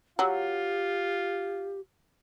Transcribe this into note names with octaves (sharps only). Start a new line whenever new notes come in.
F#3 F4 G4